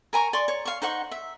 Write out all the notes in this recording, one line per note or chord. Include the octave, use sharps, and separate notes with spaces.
A#4 G#5 A#5 C#6
D5 C6 C#6
C#5
F5 C#6
D#4 C5 F#5 C#6
E5